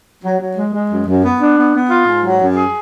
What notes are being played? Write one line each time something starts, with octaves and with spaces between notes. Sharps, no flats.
F#3
F#3
G#3
G#3
F#2
F#2
B3
D4
B3
B3
F4
G#2
F#3
F#2
G#4